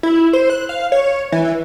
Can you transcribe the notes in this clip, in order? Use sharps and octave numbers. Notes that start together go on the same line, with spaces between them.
E4
C5
F#6
F5
C#5
E3